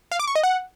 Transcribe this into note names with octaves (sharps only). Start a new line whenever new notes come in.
F5
D6
C#6
D#5
F#5